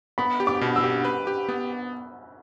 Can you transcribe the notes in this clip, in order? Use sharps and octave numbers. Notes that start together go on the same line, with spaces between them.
B3 B5
G4
D6
B2
E6
G4
B4
G4
B3